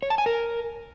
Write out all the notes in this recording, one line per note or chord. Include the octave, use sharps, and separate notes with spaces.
C#5
A5
G#5
A#4